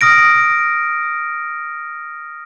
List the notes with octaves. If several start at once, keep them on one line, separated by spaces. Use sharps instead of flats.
D#6 F6 A#6 D7